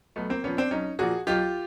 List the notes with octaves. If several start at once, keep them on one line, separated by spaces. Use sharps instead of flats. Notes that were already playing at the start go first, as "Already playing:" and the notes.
B1 A3 B3
A#3 C4
A#2 F3 B3 C#4
C4 D4
B1 C#4 D#4
A#2 F3 F#4 G#4
B1 F4 G4